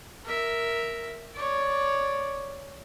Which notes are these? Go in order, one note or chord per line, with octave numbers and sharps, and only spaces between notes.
A#4 E5
C#5 D5